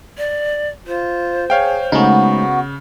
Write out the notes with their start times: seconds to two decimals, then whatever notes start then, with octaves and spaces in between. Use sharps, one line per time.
0.18 D5
0.87 F4 C5
1.50 G#4 C#5 F5 G5
1.92 C#3 G#3 A3 B3 D#4 F#4